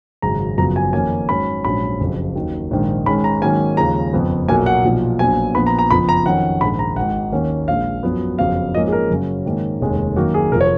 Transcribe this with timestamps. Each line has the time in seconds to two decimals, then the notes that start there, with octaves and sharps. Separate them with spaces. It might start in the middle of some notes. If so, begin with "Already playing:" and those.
0.22 G#1 F#2 C#3 G#3 C#4 A#5
0.58 F#1 F#2 C#3 F3 B3 A#5
0.76 G#5
0.93 F2 D#3 A#3 C#4 G#5
1.29 G#2 F#3 C#4 B5
1.64 A#1 G#2 F#3 C#4 B5
2.00 F#1 F2 C#3 F#3
2.35 D#2 D#3 F#3
2.71 A#1 G#2 D#3
3.06 G#2 D#3 G#3 C#4 B5
3.24 A#5
3.42 G#2 D#3 F#3 A#3 C#4 G#5
3.77 D#2 C#3 F3 G#3 A#5
4.13 F#1 F2 F3 B3
4.48 B1 A#2 F#3 A#3 G#5
4.66 F#5
4.84 B1 A#2 F3
5.19 A#1 A#2 F#3 B3 G#5
5.55 A#1 A#2 F3 B3 B5
5.67 A#5
5.79 A#5
5.91 F#1 F2 F3 B3 B5
6.09 A#5
6.25 F2 D#3 F#3 C#4 F#5
6.61 A#1 G#2 D#3 G#3 B5
6.79 A#5
6.96 G#1 G#2 D#3 F#5
7.32 D#2 D#3 A#3 C#4
7.68 A#1 A#2 G#3 F5
8.03 F#2 F3 B3
8.39 F#1 F2 C#3 F#3 B3 F5
8.74 G#2 F3 A#3 C#4 D#5
8.87 G#4
8.92 A#4
9.10 F#2 C#3 F#3 C#4
9.46 G#2 D#3 A#3 C#4
9.81 F1 D#2 D#3 G#3 C#4
10.16 F#2 D#3 F#3 A#3 F#4
10.34 G#4
10.52 F1 F3 A#4
10.61 C#5